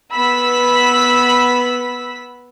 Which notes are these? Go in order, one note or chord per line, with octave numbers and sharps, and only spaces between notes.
B3 B5 E6 B6